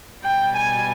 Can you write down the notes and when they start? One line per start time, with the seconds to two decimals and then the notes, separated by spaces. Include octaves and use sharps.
0.24 B2 G3 G5
0.56 G#5